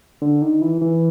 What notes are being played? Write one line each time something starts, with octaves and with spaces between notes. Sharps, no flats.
D3
D#3
E3
E3